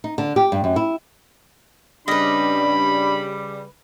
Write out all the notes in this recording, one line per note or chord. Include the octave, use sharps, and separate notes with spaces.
D#4
D3
G4
G2
F#2
E4
C#3 G3 D4 B4 D#5 B5